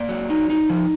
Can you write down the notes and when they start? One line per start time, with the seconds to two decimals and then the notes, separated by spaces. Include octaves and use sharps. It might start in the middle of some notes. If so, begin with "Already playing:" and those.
Already playing: A#3 D5
0.09 F#3
0.30 D#4
0.50 D#4
0.70 F3